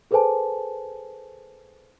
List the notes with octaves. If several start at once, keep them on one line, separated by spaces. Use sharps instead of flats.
G#4 A4 B4 C5 G#5 A5